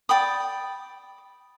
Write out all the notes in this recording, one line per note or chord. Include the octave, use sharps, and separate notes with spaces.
D5 G5 B5 D#6